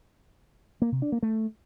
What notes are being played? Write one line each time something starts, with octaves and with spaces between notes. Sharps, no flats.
A#3
C3
D4
A#3
A3